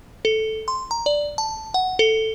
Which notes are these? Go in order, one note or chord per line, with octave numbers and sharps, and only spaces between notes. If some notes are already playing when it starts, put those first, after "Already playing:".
A4
C6
A#5
D5
A5
F#5
A4